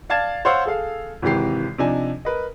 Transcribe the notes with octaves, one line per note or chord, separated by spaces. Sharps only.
D5 F5 A5 G#6 A6 E7
C5 C#5 F5 F#5 C6 E6
G#4 A4 F5
G#1 C3 E3 G4 C7
C3 F3 D4 D#4 G#5
A#4 B4 D#5